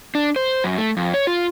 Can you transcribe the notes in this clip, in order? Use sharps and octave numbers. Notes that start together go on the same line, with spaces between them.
D4
C5
F#2
A3
F2
C#5
F4